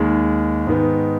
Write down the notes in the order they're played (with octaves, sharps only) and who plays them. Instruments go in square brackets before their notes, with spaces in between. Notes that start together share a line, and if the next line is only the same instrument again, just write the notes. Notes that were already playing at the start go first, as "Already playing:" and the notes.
Already playing: [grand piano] D#2 D#3 G#3
G#2 D#3 B3